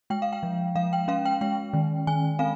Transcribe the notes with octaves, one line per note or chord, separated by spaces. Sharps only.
G#3 G5
F5
G5
F3
F3 F5
G5
C#4 F5
G5
G#3 G5
D#3
D#3 G#5
C4 F5